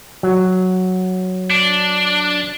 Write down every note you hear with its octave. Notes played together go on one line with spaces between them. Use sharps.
F#3
D4